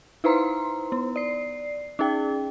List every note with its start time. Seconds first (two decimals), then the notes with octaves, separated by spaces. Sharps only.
0.24 D#4 E4 B4 C5 A#5 C6
0.92 B3
1.16 D5 C7
1.99 C#4 D#4 G#4 G5